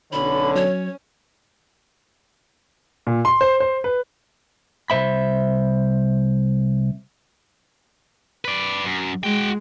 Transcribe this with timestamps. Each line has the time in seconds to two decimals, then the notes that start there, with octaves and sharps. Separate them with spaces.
0.12 B1 D3 C#4 B5
0.55 F#3 C#5
3.07 A#2
3.25 C6
3.41 C5
3.60 C5
3.84 B4
4.90 C2 E3 C5 E5 B5
8.45 B4 D5
8.84 F#2
9.24 G#3 F#4 G5